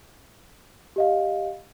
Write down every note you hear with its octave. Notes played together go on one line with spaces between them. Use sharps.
G4 D#5 F5